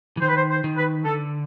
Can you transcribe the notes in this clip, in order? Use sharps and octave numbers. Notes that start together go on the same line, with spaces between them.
E3
D#3 C5
B4
C5
C5
D#3
B4
D3 A4